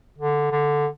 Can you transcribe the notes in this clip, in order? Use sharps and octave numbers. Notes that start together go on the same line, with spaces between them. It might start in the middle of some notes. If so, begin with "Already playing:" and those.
D3
D3